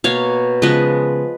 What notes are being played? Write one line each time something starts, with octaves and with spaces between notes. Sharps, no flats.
B2 A#3 C#5 F5
C#3 F3 G#3 B3 B4 D#5